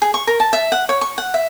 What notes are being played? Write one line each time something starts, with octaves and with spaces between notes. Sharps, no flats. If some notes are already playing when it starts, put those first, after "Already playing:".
G#4
C#6
A#4
A5
E5
F#5
C#5
C#6
F#5
E5